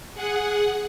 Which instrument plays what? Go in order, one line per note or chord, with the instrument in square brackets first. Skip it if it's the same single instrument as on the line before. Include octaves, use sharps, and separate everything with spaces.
[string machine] G#4 F#5